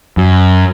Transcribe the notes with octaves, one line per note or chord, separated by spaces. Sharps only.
F#2